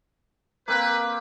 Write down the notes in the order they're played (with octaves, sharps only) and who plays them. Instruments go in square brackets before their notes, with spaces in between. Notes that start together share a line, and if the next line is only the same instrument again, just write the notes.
[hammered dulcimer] A#3 C4 [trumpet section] B4